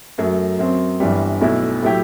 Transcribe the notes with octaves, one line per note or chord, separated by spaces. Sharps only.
F#2 F#3 A3
F#2 F#3 C4
G1 G2 E3 G3
B1 B2 A3 E4
A2 F#3 A3 E4 G4